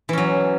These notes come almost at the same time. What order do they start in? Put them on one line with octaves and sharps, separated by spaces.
E3 C#4 F#3